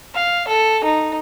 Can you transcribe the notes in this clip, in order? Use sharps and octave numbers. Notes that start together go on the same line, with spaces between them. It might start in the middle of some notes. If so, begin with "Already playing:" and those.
F5
A4
D#4